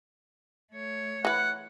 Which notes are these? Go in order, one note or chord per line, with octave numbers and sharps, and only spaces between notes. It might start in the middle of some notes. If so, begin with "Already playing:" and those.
A3 C#5
E3 B4 F#5